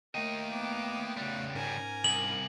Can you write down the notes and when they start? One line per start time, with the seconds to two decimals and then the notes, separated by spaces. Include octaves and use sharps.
0.15 A3 A#3 A#4 D#5 F5 G5
0.51 B3 D6
1.17 C#3 G3 F#5
1.55 G#2 C#4 A#4 G#5 A#5
2.04 C2 F#7